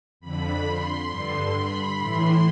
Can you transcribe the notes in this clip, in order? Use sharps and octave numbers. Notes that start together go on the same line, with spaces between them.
F2 D3 B5
C6
G2 D3 C6
B5
A2 E3 C6